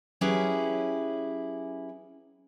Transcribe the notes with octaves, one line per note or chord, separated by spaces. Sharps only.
F#3 C#4 E4 G4 G#4 B4